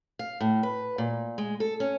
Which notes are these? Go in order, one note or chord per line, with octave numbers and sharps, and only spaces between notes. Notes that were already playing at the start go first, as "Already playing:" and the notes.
F5
A2
B4
A#2
G#3
A4
C#4